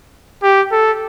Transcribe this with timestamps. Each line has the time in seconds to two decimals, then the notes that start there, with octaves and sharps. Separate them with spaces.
0.43 G4
0.72 A4